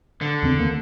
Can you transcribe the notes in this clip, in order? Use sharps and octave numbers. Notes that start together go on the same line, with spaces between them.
D3
E2 C#3 C4
D2 D#3 A#3